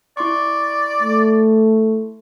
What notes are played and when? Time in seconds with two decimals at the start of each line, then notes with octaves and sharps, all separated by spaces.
0.17 E4 D5 C6 C#6
1.02 A3